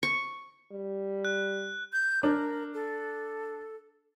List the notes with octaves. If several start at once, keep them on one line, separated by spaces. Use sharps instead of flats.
C#6
G3
F#6
G6
D4 A#4
A4